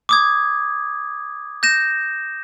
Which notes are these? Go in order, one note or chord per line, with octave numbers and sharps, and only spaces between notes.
D6 D#6 G#6
G6 A#6 E7